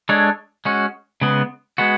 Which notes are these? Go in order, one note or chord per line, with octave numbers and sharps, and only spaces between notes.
G#3 D4 A4 C#5
G#3 C#4 F#4
C#3 G#3 B3
G#3 B3 F#4